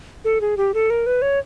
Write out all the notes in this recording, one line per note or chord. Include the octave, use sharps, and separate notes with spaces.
A4
G#4
G4
A4
A#4
B4
C#5